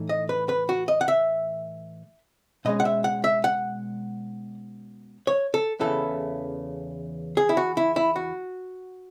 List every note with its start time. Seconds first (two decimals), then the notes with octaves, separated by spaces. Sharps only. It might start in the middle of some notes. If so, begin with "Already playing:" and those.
Already playing: A2 E3 A3 D#4
0.09 D#5
0.29 B4
0.49 B4
0.69 F#4
0.88 D#5
1.01 F#5
1.08 E5
2.65 B2 G#3 C#4 D#5
2.80 F#5
2.85 E5
3.04 F#5
3.24 E5
3.44 F#5
5.27 C#5
5.54 A4
5.80 E2 C#3 E3 B3 E4 A4
7.37 G#4
7.49 E4
7.57 F#4
7.77 E4
7.96 E4
8.16 F#4